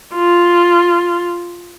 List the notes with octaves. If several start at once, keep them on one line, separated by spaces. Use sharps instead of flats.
F4